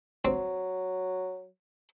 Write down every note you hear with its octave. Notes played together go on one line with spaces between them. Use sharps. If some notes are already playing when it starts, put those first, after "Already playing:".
F#3 C4